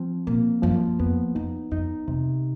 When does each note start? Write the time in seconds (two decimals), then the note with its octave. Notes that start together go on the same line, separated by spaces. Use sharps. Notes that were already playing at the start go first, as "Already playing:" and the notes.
Already playing: F3 C4
0.27 A#2 A#3
0.62 F#2 F3
0.99 F2 B3
1.35 F2 D#4
1.71 F2 D#4
2.08 F2 C3